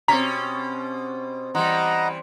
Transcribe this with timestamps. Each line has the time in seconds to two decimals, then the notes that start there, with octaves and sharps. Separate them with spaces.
0.08 B2 C4 C#4 G4 A#5 B6
1.55 E3 G3 D#5 F#5 A#5 C6